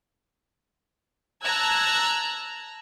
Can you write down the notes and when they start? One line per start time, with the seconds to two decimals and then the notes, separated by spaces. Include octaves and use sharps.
1.43 A5 A#5 E6 F#6 G#6